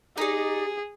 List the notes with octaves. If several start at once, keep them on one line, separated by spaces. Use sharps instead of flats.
D#4 G4 G#4 D5